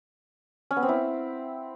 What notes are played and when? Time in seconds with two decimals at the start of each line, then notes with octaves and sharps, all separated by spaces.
0.71 C#4
0.77 B3
0.83 C4
0.89 E4